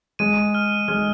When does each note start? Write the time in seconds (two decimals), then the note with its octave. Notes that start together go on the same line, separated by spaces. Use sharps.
0.19 G#3 D#7
0.55 F6
0.88 G#3 F6